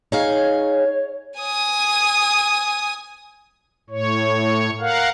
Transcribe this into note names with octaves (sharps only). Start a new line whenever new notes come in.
D#4 G#4 C#5 F5
G#5 D#6
A2 C#5
A#4 F5 F#5